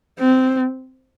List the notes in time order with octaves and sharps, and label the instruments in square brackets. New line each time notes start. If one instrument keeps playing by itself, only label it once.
[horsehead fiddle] C4